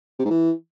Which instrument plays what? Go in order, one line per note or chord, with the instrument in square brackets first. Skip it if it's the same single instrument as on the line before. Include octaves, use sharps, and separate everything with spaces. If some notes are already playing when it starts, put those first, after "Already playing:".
[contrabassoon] C3
G#2
E3